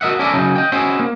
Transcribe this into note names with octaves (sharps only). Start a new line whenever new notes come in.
F#4 A#4 D#5 E5 F#5
C#4 E4 A4 A#4 D5 E5
C#3 F#3 A#3 C#4 D#4
D#5 G5
C#4 E4 F#4 G#4 C5 D#5
A#3